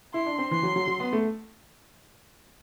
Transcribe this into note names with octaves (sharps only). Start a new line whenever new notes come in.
E4 C6
D4
C4
E3 C6
F#3
F#3
F#3
B3
A3